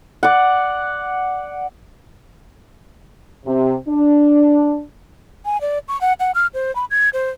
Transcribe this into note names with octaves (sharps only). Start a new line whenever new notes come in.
D5 F#5
C3
D4
G#5
D5
C#6
F#5
F#5
F6
C5
B5
G#6
C5